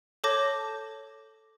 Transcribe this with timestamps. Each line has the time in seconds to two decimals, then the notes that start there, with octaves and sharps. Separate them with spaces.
0.24 A4 C#5 A5 D6 G6 A#6